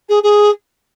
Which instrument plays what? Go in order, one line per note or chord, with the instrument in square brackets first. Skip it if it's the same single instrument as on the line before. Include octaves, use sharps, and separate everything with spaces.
[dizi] G#4
G#4